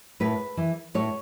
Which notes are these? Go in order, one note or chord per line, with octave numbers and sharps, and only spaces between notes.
A2 B4
E3
A2 C#5